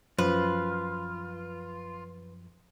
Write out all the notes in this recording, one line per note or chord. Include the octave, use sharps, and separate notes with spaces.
F#2 F3 F4 B4